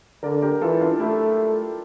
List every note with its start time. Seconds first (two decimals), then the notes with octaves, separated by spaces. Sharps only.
0.23 D3 A#4 D5
0.42 G4 A#4
0.62 E3 F4 A4
0.81 D4 F4
0.99 A3 E4 G4